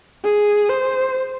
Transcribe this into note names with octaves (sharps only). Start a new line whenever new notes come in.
G#4
C5